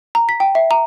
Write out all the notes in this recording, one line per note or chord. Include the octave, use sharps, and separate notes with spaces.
A#5
B6
G5
E5
A#5